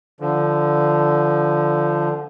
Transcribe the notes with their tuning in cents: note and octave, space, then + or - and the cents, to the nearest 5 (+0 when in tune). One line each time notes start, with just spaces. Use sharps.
D3 +0 F3 -15